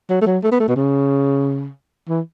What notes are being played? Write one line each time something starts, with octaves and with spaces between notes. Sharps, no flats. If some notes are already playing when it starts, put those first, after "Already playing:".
F#3
A3
F#3
A3
B3
A3
B2
C#3
E3